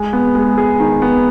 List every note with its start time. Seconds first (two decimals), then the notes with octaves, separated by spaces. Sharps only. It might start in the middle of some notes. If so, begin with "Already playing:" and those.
Already playing: G#3
0.13 B3
0.35 G#3
0.58 G#4
0.80 D#3
1.02 B3